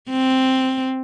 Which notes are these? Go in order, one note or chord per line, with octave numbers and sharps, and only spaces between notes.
C4